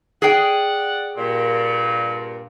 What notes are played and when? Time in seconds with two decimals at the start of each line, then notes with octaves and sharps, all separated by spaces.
0.22 G#4 D5 F#5 G5
1.16 G2 A#2